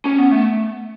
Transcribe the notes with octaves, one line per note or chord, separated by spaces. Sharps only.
C#4
B3
A3